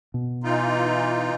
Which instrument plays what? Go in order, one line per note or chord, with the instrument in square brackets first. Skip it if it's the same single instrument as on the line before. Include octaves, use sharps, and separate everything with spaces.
[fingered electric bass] B2
[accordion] E3 D#4 F4